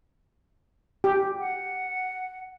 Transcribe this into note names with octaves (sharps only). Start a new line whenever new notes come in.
G4
F#5